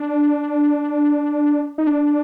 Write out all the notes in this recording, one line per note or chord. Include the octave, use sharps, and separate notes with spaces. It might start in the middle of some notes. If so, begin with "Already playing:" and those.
Already playing: D4
D#4
D4